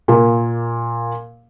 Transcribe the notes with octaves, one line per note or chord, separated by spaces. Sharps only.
A#2 A#3